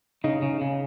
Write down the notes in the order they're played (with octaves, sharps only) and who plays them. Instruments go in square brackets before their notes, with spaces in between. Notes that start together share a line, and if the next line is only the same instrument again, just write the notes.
[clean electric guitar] C#3 [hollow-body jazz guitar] D#4
[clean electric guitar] C#3
C#3